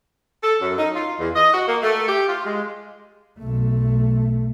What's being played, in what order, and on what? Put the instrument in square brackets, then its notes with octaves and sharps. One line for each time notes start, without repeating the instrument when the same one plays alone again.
[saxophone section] A4
F#2
D#4
F4
E2
D#5
F#4
A#3
A3
G4
F4
G#3
[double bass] B1 A3